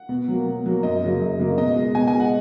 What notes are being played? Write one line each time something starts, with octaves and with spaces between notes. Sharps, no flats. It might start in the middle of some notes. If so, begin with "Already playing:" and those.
Already playing: F#5
B2
F#3 A#3
B2
F#3 A#3
F#2 D#5
C#3 F#3 A#3
F#2
C#3 F#3 A#3
B2 D#5
G#3
B2 G#5
G#5
G#3
F#5